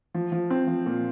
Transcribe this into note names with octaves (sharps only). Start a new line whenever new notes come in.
F3
F3
C4
F3
A#2